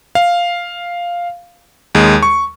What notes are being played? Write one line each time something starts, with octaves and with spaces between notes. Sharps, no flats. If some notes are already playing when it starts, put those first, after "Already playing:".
F5
D#2 G#3
C#6